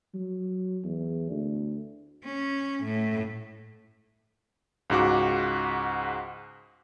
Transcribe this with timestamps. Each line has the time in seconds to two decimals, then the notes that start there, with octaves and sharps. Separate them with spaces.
0.14 F#3
0.84 E2
1.30 D2
2.24 C#4
2.84 A2
4.90 C#2 G#2 F#4 D6